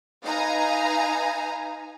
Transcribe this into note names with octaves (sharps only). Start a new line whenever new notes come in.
D#4 B4 F5 G#5 A#5